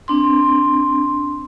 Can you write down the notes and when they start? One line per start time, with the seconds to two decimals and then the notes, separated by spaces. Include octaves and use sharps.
0.08 C4 D4 C6